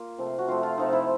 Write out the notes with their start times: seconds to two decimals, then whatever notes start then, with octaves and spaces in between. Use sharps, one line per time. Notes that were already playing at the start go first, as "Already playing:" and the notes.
Already playing: A#3 F4
0.18 C3 F3 A3
0.39 F#4
0.48 C3 F3 A3 F4
0.63 F4
0.78 C3 F3 A3 D#4
0.93 E4